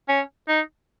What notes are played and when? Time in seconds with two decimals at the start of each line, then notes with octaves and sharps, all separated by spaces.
0.09 C#4
0.48 D#4